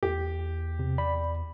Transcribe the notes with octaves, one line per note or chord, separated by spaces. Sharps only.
E2 G4
C3
D5 B5